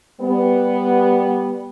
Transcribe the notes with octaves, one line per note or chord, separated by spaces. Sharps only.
G3 B3